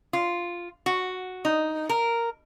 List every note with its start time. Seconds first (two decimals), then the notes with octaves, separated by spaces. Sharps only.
0.13 F4
0.86 F#4
1.45 D#4
1.89 A#4